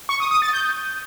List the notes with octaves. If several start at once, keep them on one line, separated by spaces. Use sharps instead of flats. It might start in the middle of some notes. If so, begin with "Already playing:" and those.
C#6
D#6
D#6
A6
G6